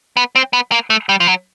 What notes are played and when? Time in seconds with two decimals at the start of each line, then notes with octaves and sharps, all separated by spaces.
0.17 B3
0.36 C4
0.53 B3
0.72 A#3
0.90 A3
1.09 G3
1.20 F3
1.27 F#3